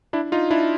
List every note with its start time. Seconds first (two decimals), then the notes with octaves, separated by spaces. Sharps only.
0.13 D4 E4
0.32 D#4 F4
0.50 D4 E4